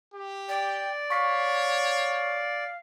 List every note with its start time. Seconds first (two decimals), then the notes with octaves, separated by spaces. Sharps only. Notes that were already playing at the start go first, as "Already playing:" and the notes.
0.14 G4
0.49 D5 G5
1.10 C#5 F5 C#6 B6